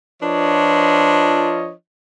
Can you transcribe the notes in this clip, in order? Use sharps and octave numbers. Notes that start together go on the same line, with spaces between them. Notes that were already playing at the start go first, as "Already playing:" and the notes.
F3 D4 F4 B4 C#5 D#5